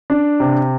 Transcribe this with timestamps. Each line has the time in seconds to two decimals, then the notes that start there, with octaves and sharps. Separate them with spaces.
0.10 D4
0.40 C3